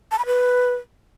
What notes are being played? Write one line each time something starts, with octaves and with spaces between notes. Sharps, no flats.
A5
B5
B4